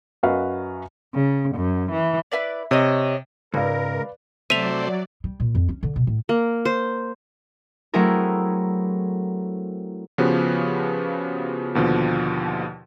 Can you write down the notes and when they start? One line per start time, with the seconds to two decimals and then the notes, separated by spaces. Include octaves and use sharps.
0.23 F#2 F#4 B4 D#5 F5 F#5
1.15 C#3
1.56 F#2
1.92 E3
2.32 E4 B4 D5
2.71 C3 C#5 D#5
3.54 C#2 G#2 A#4 B4 D5 F5
4.50 C3 F#3 A3 C5 D5 E5 D#7 F7
5.24 G3
5.40 A#2
5.55 F2
5.69 C#4
5.83 D3
5.96 B2
6.07 A2
6.29 A#3
6.65 C5
7.94 F#3 A3 C4 E4 G#4 A#4
10.18 C#3 F3 B3 F#4 G4 B4
11.75 D#2 B2 D3 F3